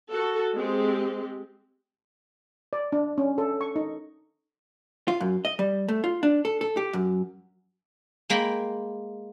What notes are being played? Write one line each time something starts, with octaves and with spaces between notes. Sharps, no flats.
F#4 A4
G#3 C4 G4
D5
D4
C#4
A4
C#6
D#4
F4
F#2
D#5
G3
A3
F4
D4
A4
A4
G4
F#2
G#3 A#3 G5 B5